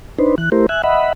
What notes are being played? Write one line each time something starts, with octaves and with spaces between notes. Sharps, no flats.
D4 D#4 B4 C5
E3 F#6
A3 E4 G4 A#4 C5
E5 G#5 F#6
D#5 E5 F#5 B5